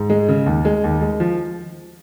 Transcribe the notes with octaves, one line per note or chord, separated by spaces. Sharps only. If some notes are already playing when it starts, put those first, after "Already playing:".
Already playing: G#2
G#3
C#3
D#2
G#3
D#2
G#3
F3